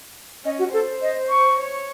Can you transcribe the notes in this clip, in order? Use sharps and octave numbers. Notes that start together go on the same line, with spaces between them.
C#4 D#5
F#4
A4 C5
D#5
C#6
C#5